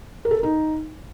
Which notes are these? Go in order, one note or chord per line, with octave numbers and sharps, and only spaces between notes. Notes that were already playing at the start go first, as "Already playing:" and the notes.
A#4
A4
A#4
D#4